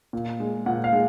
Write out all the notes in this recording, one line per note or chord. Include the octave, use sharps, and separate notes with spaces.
A#2
G#3
A#2 F#5
F5
G#3